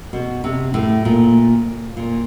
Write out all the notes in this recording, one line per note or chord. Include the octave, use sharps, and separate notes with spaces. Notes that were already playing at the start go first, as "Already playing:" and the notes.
B2
C3
A2
A#2
A#2